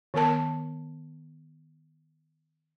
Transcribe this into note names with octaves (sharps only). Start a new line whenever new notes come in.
D#3 B3 A#4 A5